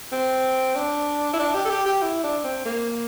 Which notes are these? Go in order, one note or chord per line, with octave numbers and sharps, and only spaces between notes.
C4
D4
E4
D4
G4
A4
G4
G4
E4
D4
C4
A#3